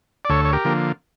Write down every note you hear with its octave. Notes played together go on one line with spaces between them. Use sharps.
D5
D2 A4 C#5
C#5
G4 A#4
D3 F3 A#3